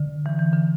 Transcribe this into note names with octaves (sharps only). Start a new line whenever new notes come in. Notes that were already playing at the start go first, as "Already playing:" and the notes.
Already playing: D3
E3
E3
D3